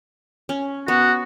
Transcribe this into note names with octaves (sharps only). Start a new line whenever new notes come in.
C#4
B3 F#4